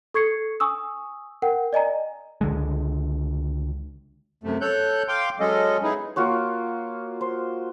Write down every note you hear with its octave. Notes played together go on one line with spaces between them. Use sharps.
A4 C#6 G#6 C7 C#7
G#5 C#6 D#6 E6
A#4 F#5 G5
D5 D#5 G#5 A#5
C#2 D3 G#3
F#2 C3 A3
A4 C#5 F#6 G6
F5 G5 C6 D6
F#3 G#3 C#4 A4 D#5
B3 D#4 E4 G#4
A#3 F4 F#4 C#5
C5